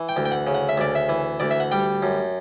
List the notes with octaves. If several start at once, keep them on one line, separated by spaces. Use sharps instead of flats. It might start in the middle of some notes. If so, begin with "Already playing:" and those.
Already playing: E3
G5
D2
G5
F#5
C#3
F#5
E5
D2 D5
E5
E3
D2 D5
E5
F#5
G3 G5
F#2